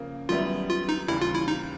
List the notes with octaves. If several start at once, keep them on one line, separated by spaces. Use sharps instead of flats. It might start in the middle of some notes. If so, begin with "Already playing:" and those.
Already playing: C#3 F3 A#3
F#2 D#3 G3 B3 E4 F4
F4
D#4
D#2 C#3 E3 G3 E4
F4
E4
D#4